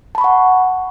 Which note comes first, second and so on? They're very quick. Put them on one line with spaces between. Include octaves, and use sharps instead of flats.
A5 B5 C#6 F#5